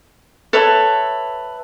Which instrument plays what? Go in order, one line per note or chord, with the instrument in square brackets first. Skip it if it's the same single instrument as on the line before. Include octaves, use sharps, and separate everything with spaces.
[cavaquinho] A4 B4 C#5 E5